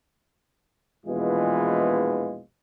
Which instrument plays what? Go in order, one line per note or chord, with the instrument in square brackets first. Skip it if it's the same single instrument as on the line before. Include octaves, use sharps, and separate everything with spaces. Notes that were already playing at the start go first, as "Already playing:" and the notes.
[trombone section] A#1 E2 B2 E3 G#3 F4